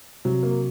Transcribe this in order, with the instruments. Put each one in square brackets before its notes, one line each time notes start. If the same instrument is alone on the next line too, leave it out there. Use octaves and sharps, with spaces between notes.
[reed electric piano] C3 [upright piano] F#3
[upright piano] A#3